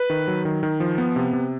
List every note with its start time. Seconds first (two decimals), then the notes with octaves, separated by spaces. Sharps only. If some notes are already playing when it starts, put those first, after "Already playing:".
Already playing: B4
0.10 D#3
0.28 F#3
0.45 D#3
0.63 D#3
0.80 F3
0.98 B3
1.16 C3
1.33 C3